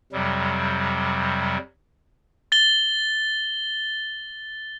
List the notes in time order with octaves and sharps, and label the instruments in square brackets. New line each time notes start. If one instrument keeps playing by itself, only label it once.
[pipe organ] F2 C3 F#3 G3
[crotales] A6 G7